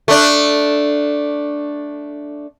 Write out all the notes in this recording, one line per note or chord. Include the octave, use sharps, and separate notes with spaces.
A3 D4